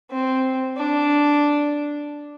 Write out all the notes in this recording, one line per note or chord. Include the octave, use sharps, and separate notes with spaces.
C4
D4